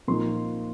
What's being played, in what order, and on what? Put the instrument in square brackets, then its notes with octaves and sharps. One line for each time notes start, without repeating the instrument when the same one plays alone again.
[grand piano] A#2 F3 A#3 D#4 C6